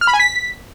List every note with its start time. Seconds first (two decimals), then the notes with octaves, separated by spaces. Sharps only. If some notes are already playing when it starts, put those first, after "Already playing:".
0.01 F6
0.07 B5
0.13 G#5
0.20 B6